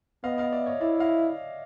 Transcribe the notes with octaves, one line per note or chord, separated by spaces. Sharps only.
B3 D#5 F5
D#5 F5
D5 E5
C#5 D#5
E4 D5 E5
D#5 F5